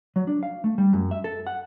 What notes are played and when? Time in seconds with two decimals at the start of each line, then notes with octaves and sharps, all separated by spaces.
0.16 F#3
0.27 D4
0.43 F5
0.64 A3
0.78 G3
0.93 F#2
1.11 E5
1.24 A4
1.47 F#5